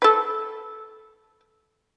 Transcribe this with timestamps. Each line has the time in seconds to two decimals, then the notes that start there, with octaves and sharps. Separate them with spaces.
0.02 A4 B4